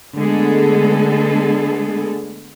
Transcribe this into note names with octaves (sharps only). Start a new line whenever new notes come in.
D3 G#3 A3 B3 G#4 A4